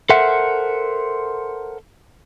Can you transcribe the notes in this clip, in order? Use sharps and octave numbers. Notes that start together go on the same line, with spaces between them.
A4 A#4 C5 E5 F#5